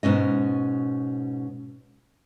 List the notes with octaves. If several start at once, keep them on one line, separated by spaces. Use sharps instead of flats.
G#2 B2 C#4 D#5